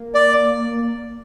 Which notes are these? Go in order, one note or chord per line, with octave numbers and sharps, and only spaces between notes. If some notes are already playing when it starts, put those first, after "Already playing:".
Already playing: A#3
D5